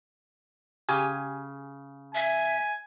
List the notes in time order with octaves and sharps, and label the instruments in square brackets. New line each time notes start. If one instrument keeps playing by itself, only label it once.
[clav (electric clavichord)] C#3 [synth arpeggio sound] G4 G#5
[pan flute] E5 [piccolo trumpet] G#5